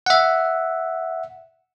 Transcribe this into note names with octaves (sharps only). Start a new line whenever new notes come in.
E5 F#5